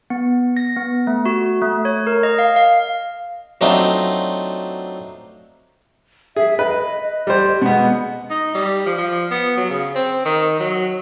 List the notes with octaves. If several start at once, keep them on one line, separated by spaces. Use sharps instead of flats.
B3
A#6
B3
A3
F#4
A3
C#5
A#4
D#5
F5
F5
F#3 A3 C4 D4 D#4 F4
G#4 E5
B4 D#5
G3 C5
B2 G#3 B3
D#4
G3
F3
F3
B3
F#3
C#3
C4
D#3
F#3